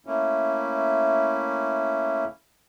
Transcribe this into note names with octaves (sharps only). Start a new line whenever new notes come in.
A3 A#3 C#4 E4